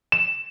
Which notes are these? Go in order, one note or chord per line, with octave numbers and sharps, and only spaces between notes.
E7